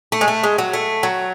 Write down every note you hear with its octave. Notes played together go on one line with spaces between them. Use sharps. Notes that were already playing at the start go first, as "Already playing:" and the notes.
A3
G#3
A3
G#3
F#3
A3
F#3